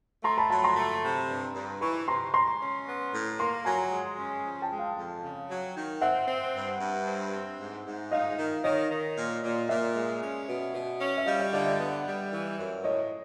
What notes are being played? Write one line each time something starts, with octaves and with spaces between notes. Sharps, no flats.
A3 A#5 C6
A5 B5
F#3 A5 B5
A#5 C6
A3
C3
G2
G2
E3 B5 C#6
C3 A#5 C6
G#3 A#5 C6
C#4
B3
A2
A#3 A#5 C6
F#3 G#5 A#5
G#3
C#4
F3
G5 A5
G#3
F5 G5
F2
C#3
F#3
D#3
C4 E5 F#5
C4
G2
G2
C4
C4
G#2
G#2
D#4 D#5 F5
D#3
D#3 C#5 D#5
D#3
A#2
A#2
A#2 D5 E5
G#3
C#4
B2
B2
C#4
E5
G3 D#5 F5
D5 E5
D3 D#5 F5
D5 E5
B3
G3
E3
F#2
A2 C#5 D#5